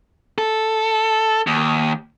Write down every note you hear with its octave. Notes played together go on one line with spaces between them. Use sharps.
A4
D#2